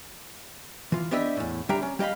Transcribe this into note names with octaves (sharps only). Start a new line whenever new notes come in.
E3 F4
B3 D4 G4 D#5 E5
E2 A2
D3 G3 D4 E5 G5 A#5
C#4
G3 G4 D#5 F5 B5